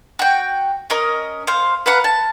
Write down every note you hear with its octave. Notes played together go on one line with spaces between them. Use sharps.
F#4 G5
C#4 A#4 D#5
C5 F5
B4 F5 F#5 A#5
A5